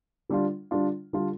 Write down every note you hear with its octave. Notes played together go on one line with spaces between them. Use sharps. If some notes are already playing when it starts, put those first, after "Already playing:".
D3 G3 D4 F4
D3 G3 D4 F4
D3 G3 D4 F4